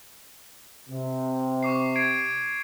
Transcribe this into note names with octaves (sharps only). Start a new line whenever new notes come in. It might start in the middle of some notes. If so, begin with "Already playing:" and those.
C3
C#6 D6 C7
G#6 C7 D7